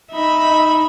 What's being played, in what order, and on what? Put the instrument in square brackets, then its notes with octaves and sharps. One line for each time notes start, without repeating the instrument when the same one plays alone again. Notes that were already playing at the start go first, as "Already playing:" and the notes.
[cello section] D#4 [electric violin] E5 B5